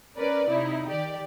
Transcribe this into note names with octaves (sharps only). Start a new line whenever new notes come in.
C#4 A#4 B4 D5
C3 D#4 E4
D#3 G4 D5